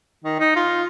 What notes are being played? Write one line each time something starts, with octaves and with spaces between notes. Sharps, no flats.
D#3
D#4
F4